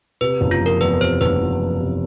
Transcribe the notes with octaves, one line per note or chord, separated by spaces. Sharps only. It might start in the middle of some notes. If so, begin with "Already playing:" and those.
C3 B4
F#1
F4
F3
A#4
E2 B4
C3 C5
F#1 B4
F3
E2
C3